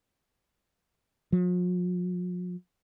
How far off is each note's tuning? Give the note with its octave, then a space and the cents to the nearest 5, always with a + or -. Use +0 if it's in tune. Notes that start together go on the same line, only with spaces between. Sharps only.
F3 +45